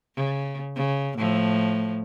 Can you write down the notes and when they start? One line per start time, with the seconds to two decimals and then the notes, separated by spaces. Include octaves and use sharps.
0.16 C#3
0.75 C#3
1.18 A2 F3